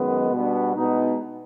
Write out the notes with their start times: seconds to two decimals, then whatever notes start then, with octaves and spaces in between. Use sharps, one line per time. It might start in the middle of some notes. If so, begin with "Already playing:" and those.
Already playing: F#2 D#3 G#3 B3
0.32 B2 G3 B3 D4
0.75 B2 G#3 B3 D#4